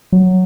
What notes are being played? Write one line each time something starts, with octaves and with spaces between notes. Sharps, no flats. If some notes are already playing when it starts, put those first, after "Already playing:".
F#3